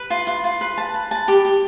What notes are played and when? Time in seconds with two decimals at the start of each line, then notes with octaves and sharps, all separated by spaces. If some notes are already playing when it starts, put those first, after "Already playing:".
Already playing: B4
0.10 F4
0.27 F4
0.44 F4
0.61 B4
0.78 A5
0.94 B4
1.11 A5
1.28 G4
1.45 G4